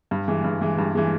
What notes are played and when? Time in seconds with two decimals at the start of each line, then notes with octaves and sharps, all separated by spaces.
0.11 G2
0.28 E3 G#3
0.44 G2
0.61 E3 G#3
0.78 G2
0.95 E3 G#3